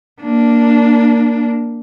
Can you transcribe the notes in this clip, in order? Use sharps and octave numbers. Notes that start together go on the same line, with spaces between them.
A#3 D4